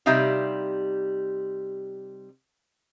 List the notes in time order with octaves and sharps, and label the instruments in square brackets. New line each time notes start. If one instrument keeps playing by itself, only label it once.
[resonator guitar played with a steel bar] C3 G3 D#4 E5 F5